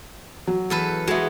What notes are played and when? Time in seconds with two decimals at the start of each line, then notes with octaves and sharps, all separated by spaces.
0.47 F#3
0.70 E2 A4 B4
1.07 G#3 B3 F#4 E5